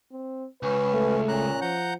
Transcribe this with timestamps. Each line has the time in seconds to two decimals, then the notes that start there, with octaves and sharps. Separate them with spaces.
0.11 C4
0.63 C#2 C#4 B4
0.94 A3
1.28 A#2 C#4 A#5 F#6
1.61 F3 F#5 A#5 G6